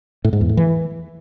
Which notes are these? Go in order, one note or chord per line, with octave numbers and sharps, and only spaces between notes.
A2
G#2
E2
A2
E3